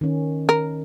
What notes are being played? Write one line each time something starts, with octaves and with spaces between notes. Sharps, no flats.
D#3 C#4
A#4